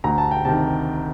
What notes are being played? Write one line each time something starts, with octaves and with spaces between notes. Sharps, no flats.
D2 A#5
A5
G5
C3 D#3 A5